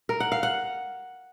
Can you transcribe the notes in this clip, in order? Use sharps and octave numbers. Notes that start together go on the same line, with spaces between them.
A#4
F#5
F5
F#5